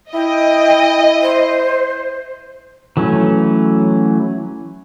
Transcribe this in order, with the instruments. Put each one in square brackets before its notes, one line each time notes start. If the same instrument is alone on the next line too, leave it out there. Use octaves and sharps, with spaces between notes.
[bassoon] E4 [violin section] D#5 [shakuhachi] G5
[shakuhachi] C5
[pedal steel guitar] E3 F#3 A3 C#4